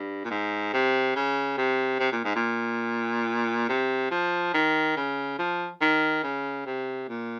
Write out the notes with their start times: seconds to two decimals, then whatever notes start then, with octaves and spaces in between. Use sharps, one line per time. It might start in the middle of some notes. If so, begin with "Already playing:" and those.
Already playing: G2
0.25 A#2
0.30 G#2
0.73 C3
1.16 C#3
1.57 C3
1.99 C3
2.12 A#2
2.25 G#2
2.36 A#2
3.69 C3
4.11 F3
4.54 D#3
4.96 C#3
5.39 F3
5.81 D#3
6.23 C#3
6.66 C3
7.08 A#2